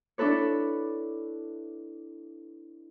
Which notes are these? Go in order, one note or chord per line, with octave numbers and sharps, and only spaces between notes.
D4 E4 A4 B4 C#5